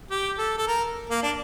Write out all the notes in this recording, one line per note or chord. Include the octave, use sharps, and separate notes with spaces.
G4
A4
A4
A#4
A#3
D4